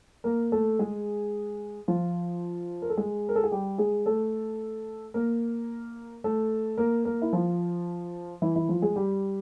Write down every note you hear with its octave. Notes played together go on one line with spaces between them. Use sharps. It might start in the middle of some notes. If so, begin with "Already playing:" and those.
A#3 A#4
A3 A4
G#3 G#4
F3 F4
A#4
A4
G#3 G#4
A#4
A4
G#4
G3 G4
G#3 G#4
A3 A4
A#3 A#4
A3 A4
A#3 A#4
A#3 A#4
E4
F3 F4
E3 E4
E3 E4
F3 F4
G#3 G#4
G3 G4